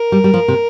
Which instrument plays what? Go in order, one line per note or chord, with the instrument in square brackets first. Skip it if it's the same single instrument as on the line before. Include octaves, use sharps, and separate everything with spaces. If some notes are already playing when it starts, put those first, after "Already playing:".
Already playing: [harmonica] A#4
[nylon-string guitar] G3
G3
F3
C3